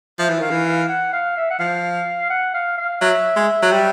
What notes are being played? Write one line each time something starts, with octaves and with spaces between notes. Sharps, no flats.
F3 E5
E3
D#3 F5
E3
F5
F#5
F5
E5
F#5
F3 F5
F#5
F5
F5
F#3 E5
G#3
F#3
G3